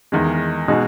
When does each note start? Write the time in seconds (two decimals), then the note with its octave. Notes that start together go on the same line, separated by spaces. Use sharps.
0.12 E2 D#3 G#3
0.68 B2 G#3 D#4 F#4